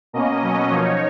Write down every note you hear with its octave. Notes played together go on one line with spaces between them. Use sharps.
B2 A#3 C#4 D#5
B2 F#3 C#4 D#5
F3 A#3 D#4 C#5